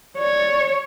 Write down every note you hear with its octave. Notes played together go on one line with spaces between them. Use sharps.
C#5 D5